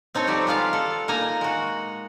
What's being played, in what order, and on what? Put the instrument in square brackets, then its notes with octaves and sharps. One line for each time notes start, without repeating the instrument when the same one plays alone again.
[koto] C4 D#4 A4 C#5
F3 G3 C4 G4
G#3 B3 F4 D5 F5
A4
A#2 A#3 D#4 G#5 A#5
G#3 F#4